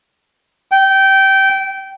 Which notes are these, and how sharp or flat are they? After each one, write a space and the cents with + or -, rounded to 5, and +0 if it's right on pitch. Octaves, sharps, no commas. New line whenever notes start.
G5 -20